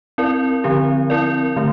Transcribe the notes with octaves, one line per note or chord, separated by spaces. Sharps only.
C4 E4 A#4 D5
D3 F3 C4 G4
C4 E4 A#4 D5
D3 A3